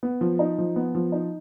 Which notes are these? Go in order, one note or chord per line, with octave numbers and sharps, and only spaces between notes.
B3
F3
D#4
F3
B3
F3
D#4